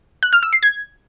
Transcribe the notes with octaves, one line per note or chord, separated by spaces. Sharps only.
F#6
F6
E6
C7
G#6